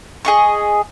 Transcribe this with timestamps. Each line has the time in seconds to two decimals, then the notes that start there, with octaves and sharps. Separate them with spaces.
0.25 G#4 D#5 C#6